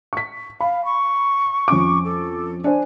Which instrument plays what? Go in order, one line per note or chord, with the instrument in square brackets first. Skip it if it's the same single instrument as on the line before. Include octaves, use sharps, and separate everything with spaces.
[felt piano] C#6 B6
[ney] F5 [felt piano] B5
[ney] C#6
[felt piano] F2 C#4 D6
[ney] A4
[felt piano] D4 C5 [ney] G#5